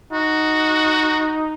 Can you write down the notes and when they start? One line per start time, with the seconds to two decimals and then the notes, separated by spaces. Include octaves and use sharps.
0.13 D#4 F#4